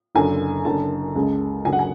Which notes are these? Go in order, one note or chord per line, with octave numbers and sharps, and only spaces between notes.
F#1 F#2 D3 G#5
F#1 F#2 D3 A5
C#2 C#3 G#3
F#1 F#2 D3 F#3 G#5
F#5
G#5